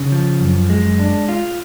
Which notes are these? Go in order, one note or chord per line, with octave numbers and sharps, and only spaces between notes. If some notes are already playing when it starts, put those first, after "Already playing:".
Already playing: C#3
F3
F#2
G#3
D4
F4